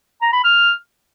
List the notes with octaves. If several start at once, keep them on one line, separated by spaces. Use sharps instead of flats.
A#5
B5
F6